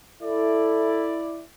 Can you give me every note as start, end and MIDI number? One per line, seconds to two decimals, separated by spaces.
0.23 1.43 64
0.23 1.21 69
0.23 1.43 74